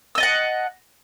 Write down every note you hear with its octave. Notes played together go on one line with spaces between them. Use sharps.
D#5 F#5 A5 E6